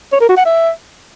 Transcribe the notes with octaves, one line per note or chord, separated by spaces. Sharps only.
C#5
A#4
F#4
F#5
E5